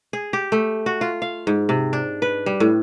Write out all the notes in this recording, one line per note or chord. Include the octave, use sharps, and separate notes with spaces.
G#4
G4
A3
F#4
F4
F5
G#2
C3
D4
B4
G3
A2